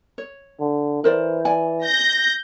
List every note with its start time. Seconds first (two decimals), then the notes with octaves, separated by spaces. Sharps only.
0.18 C#5
0.60 D3
1.04 E3 A#4 C5 D5
1.45 D5 G#5
1.84 G6 A#6